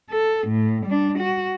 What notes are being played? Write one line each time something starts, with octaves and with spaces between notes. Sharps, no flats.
A4
A2
G3 D4
F#4